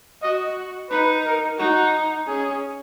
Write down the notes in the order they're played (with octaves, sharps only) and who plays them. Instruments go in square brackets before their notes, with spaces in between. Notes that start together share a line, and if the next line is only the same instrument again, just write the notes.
[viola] F#4 [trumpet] D#5
[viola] D#4 [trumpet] B4
[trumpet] A#4
[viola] D#4 [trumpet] F#4
[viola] C#4 [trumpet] G#4